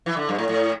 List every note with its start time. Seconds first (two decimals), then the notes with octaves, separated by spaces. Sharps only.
0.06 E3
0.17 D3
0.29 G2
0.38 A2
0.49 A2